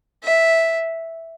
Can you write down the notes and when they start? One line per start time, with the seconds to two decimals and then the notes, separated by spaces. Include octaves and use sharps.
0.23 E5